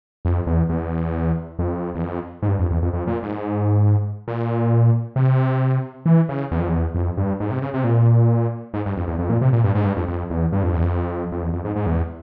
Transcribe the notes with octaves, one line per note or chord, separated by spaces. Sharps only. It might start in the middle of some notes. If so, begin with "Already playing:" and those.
F2
E2
E2
F2
E2
F2
G#2
G2
F2
E2
F2
F2
A#2
G#2
A#2
C3
E3
C#3
E2
F2
E2
F2
G2
G#2
C3
C#3
C3
A#2
G#2
G2
F2
E2
F2
A#2
C3
A#2
G2
G#2
G2
F2
F2
E2
G2
F2
E2
F2
F2
E2
F2
G#2
G#2
E2